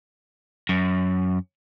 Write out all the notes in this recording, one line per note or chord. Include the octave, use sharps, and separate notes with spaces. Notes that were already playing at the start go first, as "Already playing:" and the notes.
F#2